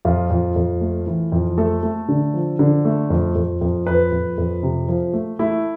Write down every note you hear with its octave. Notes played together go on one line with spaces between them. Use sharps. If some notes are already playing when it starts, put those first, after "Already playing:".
F2 F4
F2
F2
A3
E3
F2
A3 A4
A3
D3
F3
D3
A3
F2
F2
F2
F2 B4
F2
F2
C3
F3
A3
A3 E4